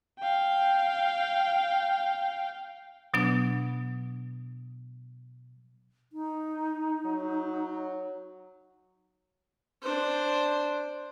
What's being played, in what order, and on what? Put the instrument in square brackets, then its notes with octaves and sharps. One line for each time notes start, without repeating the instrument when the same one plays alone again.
[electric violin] F5 G5
[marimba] B2 F#3 B3 D4 D#6
[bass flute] D#4
[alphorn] F#3
[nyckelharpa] D4 C5